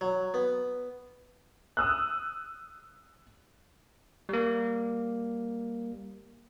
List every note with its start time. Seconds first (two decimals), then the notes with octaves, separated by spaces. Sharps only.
0.01 F#3
0.34 B3
1.77 D#6 E6 F#6
4.29 G3 A#3